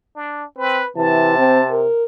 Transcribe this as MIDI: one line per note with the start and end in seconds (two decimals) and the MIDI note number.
0.15 0.45 62
0.58 0.81 60
0.58 0.90 71
0.96 1.87 48
0.96 1.34 52
0.96 1.75 81
1.37 1.60 60
1.71 2.04 70